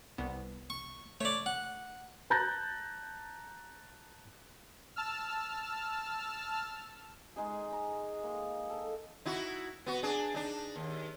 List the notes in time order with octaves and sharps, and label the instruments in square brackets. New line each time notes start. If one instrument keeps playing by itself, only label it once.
[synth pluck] C2 B3
[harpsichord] C#6
[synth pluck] A3 [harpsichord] C#5 D5
[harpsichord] F#5
[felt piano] A5 A#5 F#6 G6 A6 A#6
[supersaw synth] A5 E6 F6
[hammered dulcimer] G#3 D#4 G#4
A#5
A#3 D#5
A4
[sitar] D#4 E4 F#4
B3 F#4
D4 G#4
D4 D#4
D#2